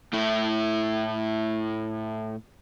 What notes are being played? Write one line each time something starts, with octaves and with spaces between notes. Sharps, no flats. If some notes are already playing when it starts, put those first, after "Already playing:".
A2 E4